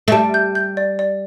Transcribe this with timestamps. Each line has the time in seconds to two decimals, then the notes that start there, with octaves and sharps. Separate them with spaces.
0.08 A3
0.12 G3 A5
0.34 G6
0.55 G6
0.77 D5
0.99 D5